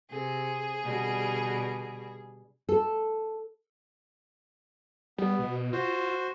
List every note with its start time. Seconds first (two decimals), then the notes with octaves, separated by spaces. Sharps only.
0.11 C3 G#4
0.84 B2 D3 G3
2.69 A4
5.18 G3 B3
5.39 B2
5.73 F4 F#4 C5